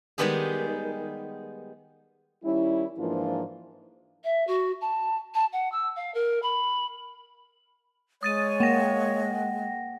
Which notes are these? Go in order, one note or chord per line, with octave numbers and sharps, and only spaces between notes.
D#3 G3 G#3 B3 G4 G#4
D#3 G3 C#4 E4
G#2 E3 F3 A#3 D4 F4
E5
F#4
A5
A5
F#5
E6
F5
A#4
B5
G#3 C#5 D#6 A6 D#7
A#3 F#5 G5 A#6